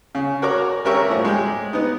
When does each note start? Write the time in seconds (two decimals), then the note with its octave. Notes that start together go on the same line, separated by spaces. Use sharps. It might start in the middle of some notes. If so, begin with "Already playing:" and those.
0.15 C#3
0.42 F#4 A#4 C#5 A#5 D6
0.85 G#1 C#4 G4 A#4 E5 C#6
1.10 A2 F3
1.25 G#3 G4
1.73 B3 D#4